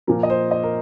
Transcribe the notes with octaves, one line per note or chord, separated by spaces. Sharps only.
A#2 F3 A#4
D#5
C5
D#5
A#4